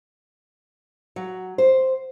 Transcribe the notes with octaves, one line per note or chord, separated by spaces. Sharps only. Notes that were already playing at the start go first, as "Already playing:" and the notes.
F#3
C5